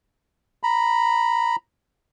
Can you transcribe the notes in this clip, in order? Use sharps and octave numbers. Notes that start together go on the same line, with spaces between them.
A#5 B5